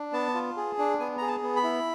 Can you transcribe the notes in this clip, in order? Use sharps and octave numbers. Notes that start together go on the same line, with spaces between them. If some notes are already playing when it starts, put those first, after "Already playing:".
Already playing: D4
B3 A5
F4
G#4
D4
B3 G#5
G#4 A#5
A5
B3
B5
E4